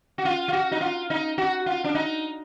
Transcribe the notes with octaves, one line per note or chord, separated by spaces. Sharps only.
F#4
F4
F4
F#4
D#4
F4
D#4
F#4
F4
D4
D#4